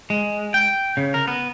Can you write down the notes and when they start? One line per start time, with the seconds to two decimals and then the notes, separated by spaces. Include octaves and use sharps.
0.10 G#3
0.54 G5
0.97 C#3
1.14 A#4
1.28 B3